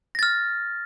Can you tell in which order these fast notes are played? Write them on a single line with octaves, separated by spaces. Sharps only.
A#6 A6 F6